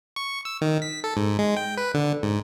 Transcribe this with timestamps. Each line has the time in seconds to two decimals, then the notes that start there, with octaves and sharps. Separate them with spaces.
0.16 C#6
0.45 E6
0.62 D#3
0.82 B6
1.04 A4
1.17 G#2
1.39 G#3
1.57 G5
1.77 B4
1.94 D3
2.23 G#2